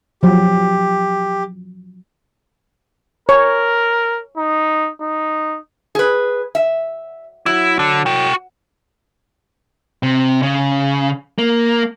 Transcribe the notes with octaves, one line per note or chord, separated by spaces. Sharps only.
F3 F#3 G4
A#4 C#5
D#4
D#4
G#4 B4
E5
F#3 E4
D3
F#4 G5
C3
C#3
A#3